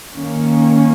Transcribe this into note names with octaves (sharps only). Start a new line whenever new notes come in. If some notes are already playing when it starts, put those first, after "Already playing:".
D#3 A#3 C#4